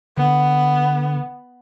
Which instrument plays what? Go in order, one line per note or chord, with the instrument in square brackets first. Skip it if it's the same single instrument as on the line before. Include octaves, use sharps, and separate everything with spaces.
[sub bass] D3 [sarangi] B3